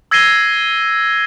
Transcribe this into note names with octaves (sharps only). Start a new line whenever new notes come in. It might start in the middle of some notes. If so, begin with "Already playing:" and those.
E6 G#6 A#6 C7 D#7 G7